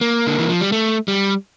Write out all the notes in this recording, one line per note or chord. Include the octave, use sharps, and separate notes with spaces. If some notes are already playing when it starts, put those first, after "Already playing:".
A#3
D3
E3
F3
G3
A3
G3